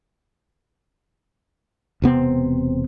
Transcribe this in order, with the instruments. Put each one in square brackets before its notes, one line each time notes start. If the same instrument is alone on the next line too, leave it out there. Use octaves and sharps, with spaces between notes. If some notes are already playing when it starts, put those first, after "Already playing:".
[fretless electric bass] E1 C3 B3 C4